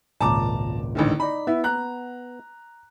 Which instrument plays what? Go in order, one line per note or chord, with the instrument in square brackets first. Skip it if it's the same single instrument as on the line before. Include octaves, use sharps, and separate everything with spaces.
[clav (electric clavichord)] G#1 C#2 A#2 [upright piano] A5 A#5 D6
[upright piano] A1 D3 D#3
[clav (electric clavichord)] D#4 D5 [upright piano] B5
[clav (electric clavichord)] B3 [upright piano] E4
[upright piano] A#5 F#6